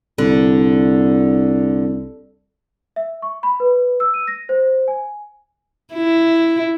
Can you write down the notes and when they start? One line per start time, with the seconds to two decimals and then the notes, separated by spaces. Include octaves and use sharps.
0.18 C2 D3
2.96 E5
3.22 C#6
3.43 B5
3.60 B4
4.00 E6
4.14 D#7
4.27 A#6
4.49 C5
4.88 G#5
5.93 E4